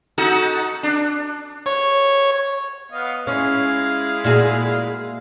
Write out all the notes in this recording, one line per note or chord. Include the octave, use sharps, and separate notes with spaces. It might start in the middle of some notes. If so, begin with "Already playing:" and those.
D#4 F#4 A4
D4
C#5
B3 D#5 F5
G#3 C#4 E4 F5
A#2 F#4 G#4